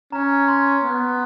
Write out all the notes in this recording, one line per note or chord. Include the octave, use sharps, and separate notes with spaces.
C#4 A#5
C6
B3